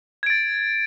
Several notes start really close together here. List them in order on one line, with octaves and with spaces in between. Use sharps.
G#6 D7 A6